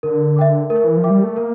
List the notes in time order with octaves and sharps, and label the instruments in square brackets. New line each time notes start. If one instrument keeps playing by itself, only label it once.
[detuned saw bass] D3 [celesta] A#4
[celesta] E5 G5 D6
[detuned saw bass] A3 [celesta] A#4
[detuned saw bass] E3
F3
[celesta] E5 G5 D6
[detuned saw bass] G3
A3
[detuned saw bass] A#3 [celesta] A#4